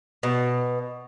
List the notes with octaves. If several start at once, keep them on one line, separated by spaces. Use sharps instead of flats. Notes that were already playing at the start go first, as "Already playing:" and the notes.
B2